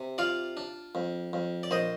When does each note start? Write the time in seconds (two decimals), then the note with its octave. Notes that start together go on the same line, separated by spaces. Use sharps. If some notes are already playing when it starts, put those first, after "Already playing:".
Already playing: C3
0.18 F4 D5 F5
0.57 D4
0.95 F2
1.33 F2
1.63 D5
1.71 A#1 C5 D#5